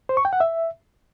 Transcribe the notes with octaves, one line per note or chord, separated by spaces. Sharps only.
C5
C#6
G5
F#5
E5